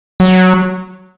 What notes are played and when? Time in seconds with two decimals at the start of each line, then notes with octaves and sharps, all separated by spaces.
0.20 F#3